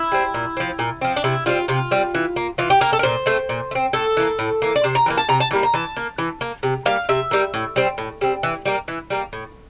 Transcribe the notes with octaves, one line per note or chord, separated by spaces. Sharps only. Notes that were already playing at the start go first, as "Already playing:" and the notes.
Already playing: E4
G3 C4
A#2
F3 C4
A#2
F3 C4
D4
C3 E4
G3 C4 F4
C3 F4
G3 C4
E3
A#3
E3 F4
G4
A#3 A#4
A4
A#4
A#2 C5
A3 C4
A#2
A3
C4
A2 A4
E3 A#3
A2
E3 A#3
D5
C3 C5
A#5
E3 G3 A#3
A5
C3 A#5
A5
E3 G3 A#3
A#5
E3 A5
A#3
E3
A#3
C3
G3 A#3 F5
C3 E5
G3 A#3
A2
G3 C4
A2
G3 C4
E3
G3 A#3
E3
G3 A#3
A2